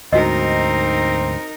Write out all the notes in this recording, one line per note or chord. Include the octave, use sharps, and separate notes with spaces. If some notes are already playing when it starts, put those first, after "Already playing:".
D2 G#2 C4 D#4 F#4 A#4 D#5